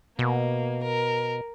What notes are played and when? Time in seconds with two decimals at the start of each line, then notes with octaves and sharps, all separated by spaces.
0.19 B2 A#3
0.83 A#4